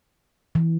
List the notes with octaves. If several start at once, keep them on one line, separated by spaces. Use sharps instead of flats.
E3